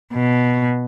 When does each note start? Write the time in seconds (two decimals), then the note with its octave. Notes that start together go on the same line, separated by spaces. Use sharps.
0.14 B2